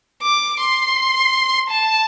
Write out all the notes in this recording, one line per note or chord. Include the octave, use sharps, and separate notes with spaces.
D6
C6
A5